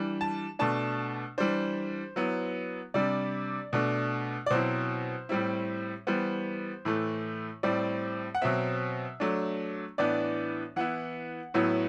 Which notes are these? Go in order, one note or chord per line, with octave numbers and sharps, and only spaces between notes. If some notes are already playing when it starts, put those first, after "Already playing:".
Already playing: E3 G3 D4
A5
B2 A3 D4 A5
E3 G3 D4 C5
F#3 B3 E4
C3 G3 D4 D5
B2 A3 D4
D5
B2 F#3 C4 E4 C5
A2 G3 C4 E4
E3 G3 B3 C5
A2 E3 A3
A2 G3 C4 D5
F#5
B2 F#3 C4 E5
F#3 A3 D4
A2 E3 B3 D4 D5
E3 B3 E4 F#5
A2 F#3 B3 E4